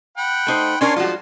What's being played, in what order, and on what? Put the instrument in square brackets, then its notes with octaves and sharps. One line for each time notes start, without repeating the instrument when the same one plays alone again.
[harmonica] F#5 G5 B5
[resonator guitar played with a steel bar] A3 D#4 C5
[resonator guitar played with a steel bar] C#4 D4 A#4 [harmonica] C#5 G#5 C6
[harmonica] F3 G3 G#3 [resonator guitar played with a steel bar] F4 F#4